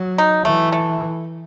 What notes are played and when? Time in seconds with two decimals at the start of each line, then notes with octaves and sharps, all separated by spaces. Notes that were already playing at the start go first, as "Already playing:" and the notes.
Already playing: F#3
0.18 D#4
0.45 E3 A3
0.72 A3